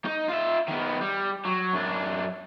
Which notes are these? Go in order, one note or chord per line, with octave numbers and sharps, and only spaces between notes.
D#4
F4 E5
D#3 B3
G3
F#3
F#2 D4